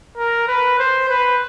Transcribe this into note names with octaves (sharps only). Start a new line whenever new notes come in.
A#4
B4
C5
B4